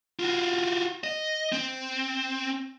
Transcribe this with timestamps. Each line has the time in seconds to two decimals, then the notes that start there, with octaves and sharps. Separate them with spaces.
0.19 F4 F#4
1.04 D#5
1.52 C4